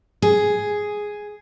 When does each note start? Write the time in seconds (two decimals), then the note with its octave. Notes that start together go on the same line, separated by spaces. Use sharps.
0.22 G#4